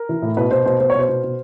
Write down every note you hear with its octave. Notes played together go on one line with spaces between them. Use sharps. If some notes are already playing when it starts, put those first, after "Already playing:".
Already playing: A#4
E3
A2
B2 B4
B2 C5
B2 C5
B2 C5
C#5
B2 C5
B2
B2